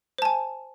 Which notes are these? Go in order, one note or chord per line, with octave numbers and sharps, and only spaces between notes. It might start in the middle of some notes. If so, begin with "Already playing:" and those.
C5 G#5 A5